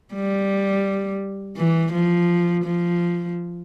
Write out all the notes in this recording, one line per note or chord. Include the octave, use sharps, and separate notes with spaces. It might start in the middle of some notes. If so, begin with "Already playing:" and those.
G3
E3
F3
F3